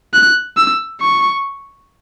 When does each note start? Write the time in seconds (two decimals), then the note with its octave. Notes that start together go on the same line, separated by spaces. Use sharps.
0.14 F#6
0.57 E6
1.01 C#6